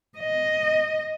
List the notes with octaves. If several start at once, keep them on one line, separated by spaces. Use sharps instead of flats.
D#5